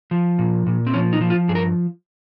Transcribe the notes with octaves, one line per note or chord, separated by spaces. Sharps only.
F3
A#2
A#2
C4
F3 C#4
D#4
F3
F4
G2 G#4
A#4